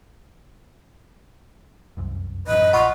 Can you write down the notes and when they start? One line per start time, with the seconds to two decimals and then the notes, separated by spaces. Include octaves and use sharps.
1.97 F1 C2 F#2
2.47 A1 F#2 B4 D#5
2.73 A#1 F4 D#5 F#5 B5 C#6